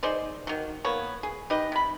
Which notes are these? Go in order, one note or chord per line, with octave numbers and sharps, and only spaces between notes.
D#4 G#4 C5 D5
D#3 F#3
A#3 B3 C#5
G#4
D#4 G4 B4 D#5
C3 B5